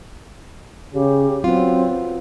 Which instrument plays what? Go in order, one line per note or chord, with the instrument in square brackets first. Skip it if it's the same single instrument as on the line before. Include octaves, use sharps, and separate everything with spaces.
[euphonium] C#3 [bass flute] G4
[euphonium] F#3 [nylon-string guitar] B3 F4 [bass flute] C4